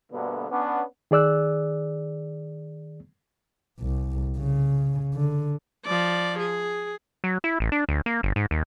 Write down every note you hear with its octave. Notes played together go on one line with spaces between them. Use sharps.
D2 G2 B2 D3 A#3 B3
B3 C#4 D4
D#3 G#4 D5 E6 F#6
C2
C#3
D3
F3 D5
G#4
F#3
E4
A1
D4
D2
A#3
G1
G#2
D#2